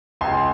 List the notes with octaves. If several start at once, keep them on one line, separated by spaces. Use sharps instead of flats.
C#2 G#5 C6